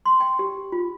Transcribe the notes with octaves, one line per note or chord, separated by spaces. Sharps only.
C6
G5
G4
F4